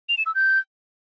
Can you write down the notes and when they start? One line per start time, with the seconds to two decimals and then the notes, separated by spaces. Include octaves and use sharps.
0.09 F7
0.18 E7
0.26 E6
0.35 G6